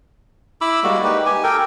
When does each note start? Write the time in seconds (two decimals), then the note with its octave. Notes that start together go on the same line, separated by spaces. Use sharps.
0.61 E4 B5 D6 E6
0.83 G3 G#3 A#3 F#4
1.04 D#4 G4 B4
1.26 G4 G#5
1.44 A4 A#4 G5